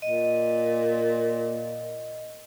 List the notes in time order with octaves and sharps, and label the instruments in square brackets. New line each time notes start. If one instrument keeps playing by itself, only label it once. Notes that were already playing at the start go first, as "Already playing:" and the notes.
[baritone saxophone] A#2 [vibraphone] D#5